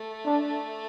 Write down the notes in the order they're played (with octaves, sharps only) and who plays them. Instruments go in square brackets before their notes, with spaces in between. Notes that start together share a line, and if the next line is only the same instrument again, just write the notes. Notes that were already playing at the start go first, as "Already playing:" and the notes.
Already playing: [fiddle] A3
[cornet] D4